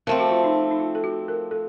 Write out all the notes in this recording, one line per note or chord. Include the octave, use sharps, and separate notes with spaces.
F3 A3 C4 A#4
F#4
F4
D#4
D#4
D#4
F4
A4
F#4
A#4
A4